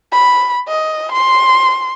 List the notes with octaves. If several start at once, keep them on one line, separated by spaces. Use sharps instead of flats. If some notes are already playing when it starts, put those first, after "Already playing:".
B5
D#5
C6